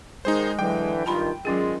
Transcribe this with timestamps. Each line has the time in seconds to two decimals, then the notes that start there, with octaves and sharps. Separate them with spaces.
0.25 D#3 G#3 D#4 G#4 C5
0.59 D3 E3 F#3 G5
1.06 G2 D#3 F4 A5 B5 C6
1.45 G#2 D#3 F#3 G#3 C#4 F4 G#4